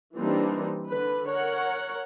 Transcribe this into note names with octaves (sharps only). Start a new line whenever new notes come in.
E3 G3 A#3 C4 D4 D#4
D3 B4
A#4 C#5 F#5